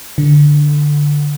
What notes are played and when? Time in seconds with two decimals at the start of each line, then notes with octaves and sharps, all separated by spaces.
0.18 D3